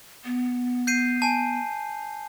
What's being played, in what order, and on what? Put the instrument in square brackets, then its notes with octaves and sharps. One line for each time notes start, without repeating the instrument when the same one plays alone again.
[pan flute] B3
[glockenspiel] G6 C7 D#7
G#5 A5